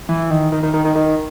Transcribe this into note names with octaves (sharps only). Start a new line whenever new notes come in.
E3
D#3
D#3
D#3
D#3
D#3
D#3